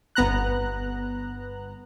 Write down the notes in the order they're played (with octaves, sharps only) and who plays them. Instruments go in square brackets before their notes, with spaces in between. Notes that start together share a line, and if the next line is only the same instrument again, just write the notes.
[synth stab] G1 B3 A#5 F#6